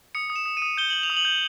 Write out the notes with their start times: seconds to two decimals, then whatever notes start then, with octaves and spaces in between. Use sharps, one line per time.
0.15 D#6 C#7
0.30 D#6
0.36 E7
0.46 D#6
0.57 D#7
0.62 D#6
0.77 G6 G7
0.90 G6 F#7
1.03 F7
1.10 D#6
1.17 F#7
1.25 G6